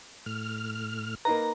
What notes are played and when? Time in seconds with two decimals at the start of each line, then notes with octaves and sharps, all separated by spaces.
0.26 A2 F6
1.25 A#3 D#4 B4 A#5